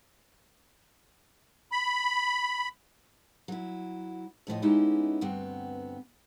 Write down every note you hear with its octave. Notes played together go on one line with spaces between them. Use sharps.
B5
F#3 E4
F2 A2 F3 D#5
G#3 B3 C#4 D#4 E4 G4
D2 G2 B3 C4